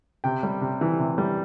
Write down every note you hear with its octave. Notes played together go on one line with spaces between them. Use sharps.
C3 G5
G3
C3
E3
C3
G3